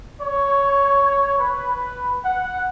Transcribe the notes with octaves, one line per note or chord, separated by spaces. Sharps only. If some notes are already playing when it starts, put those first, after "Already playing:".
C#5
B4
F#5